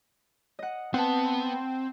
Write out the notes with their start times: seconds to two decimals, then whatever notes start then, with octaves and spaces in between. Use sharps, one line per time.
0.59 D#5 F#5
0.94 B3 C4 F#5 A5